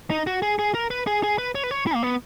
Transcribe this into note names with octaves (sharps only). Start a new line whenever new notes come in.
D#4
F#4
G#4
G#4
A#4
B4
G#4
G#4
B4
C#5
B4
C#5
E4
A#3
B3